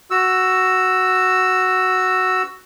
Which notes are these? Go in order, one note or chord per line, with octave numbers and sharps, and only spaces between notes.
F#4 E6